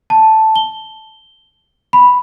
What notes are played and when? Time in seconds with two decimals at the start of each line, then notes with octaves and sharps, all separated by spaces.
0.10 A5
0.56 G7
1.93 B5